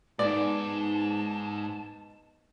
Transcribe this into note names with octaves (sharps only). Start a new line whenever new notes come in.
G#2 B3 D#4 D5 A5